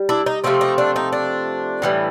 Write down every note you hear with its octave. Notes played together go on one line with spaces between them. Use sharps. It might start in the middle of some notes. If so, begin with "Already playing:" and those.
Already playing: G3
D4 E4
D#4
C3 F3 A3 C4 D#4
D#4
D4
D#4
D4
A2 E3 G3